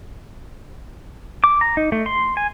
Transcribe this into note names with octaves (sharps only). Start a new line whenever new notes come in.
D6
A#5
D#4
A3
C6
G#5